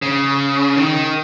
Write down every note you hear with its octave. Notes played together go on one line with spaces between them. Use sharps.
C#3
D#3